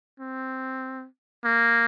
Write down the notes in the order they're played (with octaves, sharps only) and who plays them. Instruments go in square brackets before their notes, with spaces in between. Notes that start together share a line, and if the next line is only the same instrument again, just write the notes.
[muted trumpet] C4
A#3